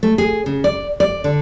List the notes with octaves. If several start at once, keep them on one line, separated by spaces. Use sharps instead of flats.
A3
G#4
C#3
D5
D5
D3